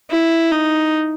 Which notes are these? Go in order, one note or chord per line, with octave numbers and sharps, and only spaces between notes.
E4
D#4